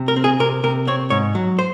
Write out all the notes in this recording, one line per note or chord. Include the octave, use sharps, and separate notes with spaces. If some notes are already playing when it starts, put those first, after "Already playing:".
Already playing: C3
A#4
C4
G#4
C3 A#4
C3 A#4
C4 C#5
G#2 C#5
F#3
C5